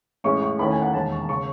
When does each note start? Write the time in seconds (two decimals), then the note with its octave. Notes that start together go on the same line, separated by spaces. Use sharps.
0.24 A1 A2 G#3 C#4 C#6
0.42 C#6
0.59 D#2 D#3 A3 C#4 E4 B5
0.71 G#5
0.82 F#5
0.93 E1 D#2 D#3 A5
1.12 C#6
1.29 C#3 C#6